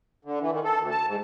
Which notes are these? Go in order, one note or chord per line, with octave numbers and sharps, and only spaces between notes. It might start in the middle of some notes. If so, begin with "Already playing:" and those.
D3
E3
D#3
A4
D2
A5
G#2